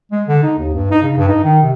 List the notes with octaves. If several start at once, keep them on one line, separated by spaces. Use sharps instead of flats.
G#3
D3
D#4
D#2
G2
D#4
C#3
G2
D#4
D#3
C3